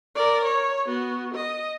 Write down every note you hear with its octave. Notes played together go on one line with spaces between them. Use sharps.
A#4 D5
C#5
B3 F#4
D#5